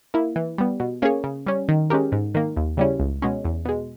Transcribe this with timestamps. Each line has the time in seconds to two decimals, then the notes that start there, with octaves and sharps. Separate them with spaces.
0.14 A#3 E4
0.36 E3
0.58 G3 B3
0.80 B2
1.02 A#3 C#4 G#4 C#5
1.24 C#3
1.47 G3 C#4
1.69 D#3
1.90 G#3 C#4 G4 A#4
2.12 G#2
2.35 D#3 A#3
2.57 D#2
2.77 C#3 G3 C#4 E4
3.00 C#2
3.22 B2 G#3 C#4
3.45 E2
3.65 B2 G#3